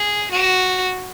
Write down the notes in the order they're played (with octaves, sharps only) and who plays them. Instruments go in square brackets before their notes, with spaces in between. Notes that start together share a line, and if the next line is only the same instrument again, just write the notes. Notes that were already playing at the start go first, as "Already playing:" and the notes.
Already playing: [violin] G#4
F#4